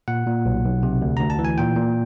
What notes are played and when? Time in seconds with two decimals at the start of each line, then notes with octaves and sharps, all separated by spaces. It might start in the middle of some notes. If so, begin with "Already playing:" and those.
0.08 A#2 F#5
0.27 A#2
0.45 B1
0.65 B1
0.83 C3
1.02 D2
1.17 D2 A#5
1.30 A5
1.39 E3
1.45 G#5
1.58 A#2 G5
1.76 A#2